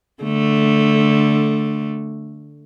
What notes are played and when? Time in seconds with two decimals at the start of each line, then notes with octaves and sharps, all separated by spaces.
0.23 D3 A3